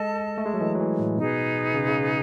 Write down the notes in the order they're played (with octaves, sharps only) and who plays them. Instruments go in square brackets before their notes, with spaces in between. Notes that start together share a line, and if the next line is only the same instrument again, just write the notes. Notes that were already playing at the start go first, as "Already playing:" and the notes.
Already playing: [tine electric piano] G#3 [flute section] A4 D#5 A5
[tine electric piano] A3
G#3
F#3
E3
F#3
E3
A2
[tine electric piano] B2 [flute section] D#4 G#4 B4
[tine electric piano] C#3
C#3